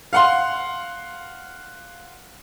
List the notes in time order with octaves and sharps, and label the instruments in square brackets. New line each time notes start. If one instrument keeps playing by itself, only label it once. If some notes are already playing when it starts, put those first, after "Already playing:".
[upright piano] F5 F#5 C6